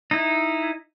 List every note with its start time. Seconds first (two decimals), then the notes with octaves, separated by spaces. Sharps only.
0.11 D#4 E4